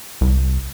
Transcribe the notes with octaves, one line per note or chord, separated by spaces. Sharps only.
C2